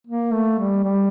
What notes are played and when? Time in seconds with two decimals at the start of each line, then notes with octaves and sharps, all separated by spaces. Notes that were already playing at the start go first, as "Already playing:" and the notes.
0.07 A#3
0.32 A3
0.59 G3
0.84 G3